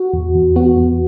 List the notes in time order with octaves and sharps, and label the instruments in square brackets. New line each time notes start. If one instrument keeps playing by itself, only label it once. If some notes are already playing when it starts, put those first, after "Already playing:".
Already playing: [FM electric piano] F#4
E2
E2
B3 F#4
E2